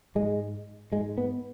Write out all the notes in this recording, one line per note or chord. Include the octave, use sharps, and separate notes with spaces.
G#2 G#3
G#2 G#3
B3